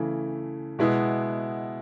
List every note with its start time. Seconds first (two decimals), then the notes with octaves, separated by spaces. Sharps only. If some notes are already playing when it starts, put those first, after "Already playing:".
Already playing: C#3 E3 A3
0.79 B2 G#3 B3 E4